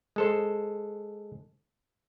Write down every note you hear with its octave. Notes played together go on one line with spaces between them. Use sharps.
G#3 A4 C5